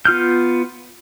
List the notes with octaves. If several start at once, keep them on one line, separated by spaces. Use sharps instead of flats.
B3 F4 F6 G6